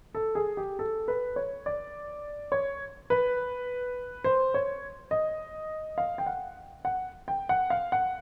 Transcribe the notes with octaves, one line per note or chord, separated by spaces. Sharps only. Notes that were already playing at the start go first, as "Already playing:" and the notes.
A4
G#4
G4
A4
B4
C#5
D5
C#5
B4
C5
C#5
D#5
F5
G5
F#5
F#5
G5
F#5
F5
F#5